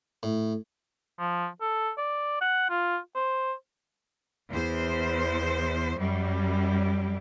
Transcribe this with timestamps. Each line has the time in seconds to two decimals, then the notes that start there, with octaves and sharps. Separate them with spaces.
0.23 A2
1.19 F3
1.61 A4
1.98 D5
2.41 F#5
2.70 F4
3.16 C5
4.50 E2 C5
5.98 F#2 G3